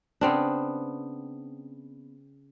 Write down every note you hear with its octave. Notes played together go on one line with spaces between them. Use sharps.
C#3 B3 C4 D4